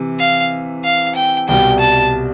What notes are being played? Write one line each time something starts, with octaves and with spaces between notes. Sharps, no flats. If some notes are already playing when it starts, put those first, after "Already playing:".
Already playing: C3 E3
F5
F5
G5
C2 B2 G3 G5
A5